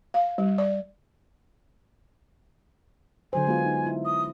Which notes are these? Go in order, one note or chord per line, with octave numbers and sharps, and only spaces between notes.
F5
G3
D5
D3 F#3 C5 G#5
G#3 B3 F4
D#4
E4
D#6